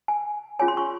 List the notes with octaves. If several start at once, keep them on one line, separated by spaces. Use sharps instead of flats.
G#5
C#4 F4 G#4 C#5 G#5
C6
C#6